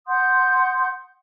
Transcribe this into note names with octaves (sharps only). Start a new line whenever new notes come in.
F#5 C6 D#6 G6